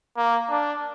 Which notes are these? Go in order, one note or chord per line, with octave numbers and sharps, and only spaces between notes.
A#3
D4